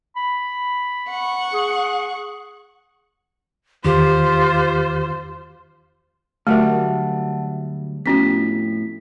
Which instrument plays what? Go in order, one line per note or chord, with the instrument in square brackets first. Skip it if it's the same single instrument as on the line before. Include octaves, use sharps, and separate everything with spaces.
[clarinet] B5
[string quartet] F#5 C#6
[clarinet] G#4
[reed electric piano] E2 D#3 [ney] F4 [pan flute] G4 [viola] C5
[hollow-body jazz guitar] D2 F#3 G3 [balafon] A3 A#4 [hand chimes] E5 F#5 A5
[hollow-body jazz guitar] F2 A2 [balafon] B3 C#4 F#4 [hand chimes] B6